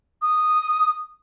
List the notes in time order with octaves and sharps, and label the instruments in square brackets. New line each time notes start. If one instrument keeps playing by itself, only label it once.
[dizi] D#6